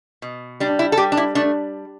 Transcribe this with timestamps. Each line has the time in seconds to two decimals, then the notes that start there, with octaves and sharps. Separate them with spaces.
0.22 B2
0.60 G3 D4
0.79 E4
0.92 A4
0.97 G3 G4
1.12 D4
1.17 E4
1.35 A3 D4